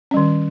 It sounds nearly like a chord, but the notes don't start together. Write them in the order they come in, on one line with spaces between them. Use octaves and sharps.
C#4 G3 D#3